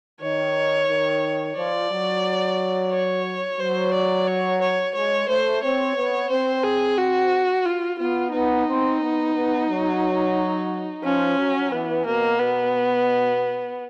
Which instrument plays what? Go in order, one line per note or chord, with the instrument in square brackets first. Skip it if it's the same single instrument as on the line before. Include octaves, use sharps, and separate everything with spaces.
[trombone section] D#3 [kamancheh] C#5
[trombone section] D#3
[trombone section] F3 [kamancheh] D5
[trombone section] F#3
[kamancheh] C#5
[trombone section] F#3 [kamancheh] C5
[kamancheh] D5
C#5
C#5
[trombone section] G#3 [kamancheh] C#5
[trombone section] A3 [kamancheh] C5
[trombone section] C4 [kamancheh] C#5
[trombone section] B3
[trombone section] C4 [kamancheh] C5
[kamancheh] G#4
F#4
F4
[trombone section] B3 [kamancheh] F4
[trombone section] B3 [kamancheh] D#4
[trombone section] C4
B3
B3
F#3
[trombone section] F3 [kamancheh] C#4
[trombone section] F#3
[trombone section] E3 [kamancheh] B3
[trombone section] B2 [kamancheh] A#3
[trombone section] B2 [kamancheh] B3